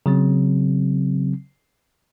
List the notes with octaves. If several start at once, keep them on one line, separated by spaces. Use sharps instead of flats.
C#3 F#3 C4